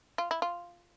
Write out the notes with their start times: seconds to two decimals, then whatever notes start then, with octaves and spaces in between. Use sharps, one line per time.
0.18 F4
0.31 E4
0.42 F4